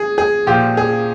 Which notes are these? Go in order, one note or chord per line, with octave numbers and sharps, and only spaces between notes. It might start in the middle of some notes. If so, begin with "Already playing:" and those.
Already playing: G#4
G#4
A#2 F3 G4
G#4